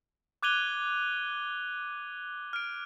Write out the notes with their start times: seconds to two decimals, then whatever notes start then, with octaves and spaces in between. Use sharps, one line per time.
0.43 D6 F#6 G#6 D#7 F7 G7
2.53 F6 D7